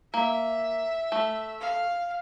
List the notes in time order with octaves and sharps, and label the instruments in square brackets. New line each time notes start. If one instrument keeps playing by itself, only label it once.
[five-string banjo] A#3 [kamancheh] E5
[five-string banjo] A3
[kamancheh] F5